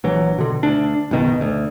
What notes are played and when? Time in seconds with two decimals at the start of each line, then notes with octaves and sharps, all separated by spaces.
0.04 A#1 E3 F#3
0.38 B2 D3
0.63 D2 D4
1.11 F#1 B1 B2 D#3
1.41 D2